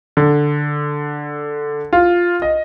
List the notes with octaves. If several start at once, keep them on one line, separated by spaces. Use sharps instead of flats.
D3
F4
D#5